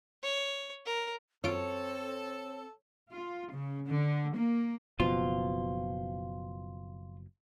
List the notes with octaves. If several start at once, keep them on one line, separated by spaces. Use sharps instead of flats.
C#5
A#4
F#2 C4 F4 A4 C#5 D7
F4
C#3
D3
A#3
F#1 B2 F3 F4